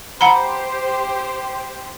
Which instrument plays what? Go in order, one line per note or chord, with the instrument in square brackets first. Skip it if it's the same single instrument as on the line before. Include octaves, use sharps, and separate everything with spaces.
[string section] G4 C5 [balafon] F#5 A#5 B5